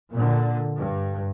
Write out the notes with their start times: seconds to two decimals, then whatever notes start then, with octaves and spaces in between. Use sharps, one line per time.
0.12 A#2 D3
0.77 G2